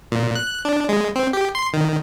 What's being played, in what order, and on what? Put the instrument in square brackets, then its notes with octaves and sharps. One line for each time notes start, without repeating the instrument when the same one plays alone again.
[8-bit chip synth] A#2
F#6
D4
G#3
C4
G4
C6
D#3